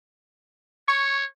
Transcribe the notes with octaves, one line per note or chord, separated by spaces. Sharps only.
C#5 C#6